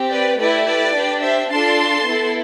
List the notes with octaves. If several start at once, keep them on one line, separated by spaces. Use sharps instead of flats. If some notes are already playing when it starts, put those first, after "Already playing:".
Already playing: C4 G4
B4 D5
A3 E4 G4 B4 D5
B4 D5
D4 G4
C5 E5
D4 F4 A4 A5 C6
B3 E4 A4